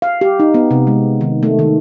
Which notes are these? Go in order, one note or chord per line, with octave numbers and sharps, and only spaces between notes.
F5
G4
D#4
B3
C3
G#3
D#3
A3
D#3